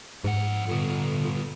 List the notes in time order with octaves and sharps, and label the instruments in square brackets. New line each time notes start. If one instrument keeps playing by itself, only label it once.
[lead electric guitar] F2 F#5 [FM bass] G#2
[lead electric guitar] G2 B3 [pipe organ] A#2 D3